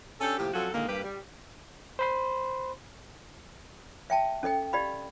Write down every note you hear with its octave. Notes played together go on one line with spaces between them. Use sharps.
C#4 D4 G4 A4
A2 C3 F3 A#3 G4
F3 F#3 C4 C#4 F#4 A4
A#2 D3 D#3 G#3 A#3
G2 G3 A#3 G4 B4
G3
C5 B5 C6
E5 G5 A5
C#4 A4 D#5 G5
G4 D5 D#5 F5 B5